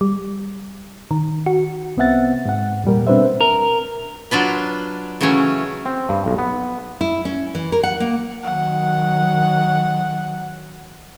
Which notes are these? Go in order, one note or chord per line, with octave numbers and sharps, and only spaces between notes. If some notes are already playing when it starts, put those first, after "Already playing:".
G3
D#3
F#4
C2 B3 C4 E5 F#5 A6
G#2 F#5
E2 A#2 G3 A#4
B2 C4 D4 B4 C5 E5
A#4
F#3 D4 F4 B4
C#3 E3 F#3 A3 C#4
C4
G2
B1
B3
E4
C#4
E3
A#4
F#5
A#3
D#3 F#3 F#5